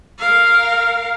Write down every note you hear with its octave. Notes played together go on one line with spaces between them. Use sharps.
A#4 F5